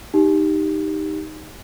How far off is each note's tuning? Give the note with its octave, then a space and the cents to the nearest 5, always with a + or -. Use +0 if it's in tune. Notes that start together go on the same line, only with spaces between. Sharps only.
D#4 +0 G4 +0